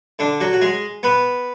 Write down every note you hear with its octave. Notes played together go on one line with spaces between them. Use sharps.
D3 D4
F#3 F#4
F#4
G#3 G#4
B3 B4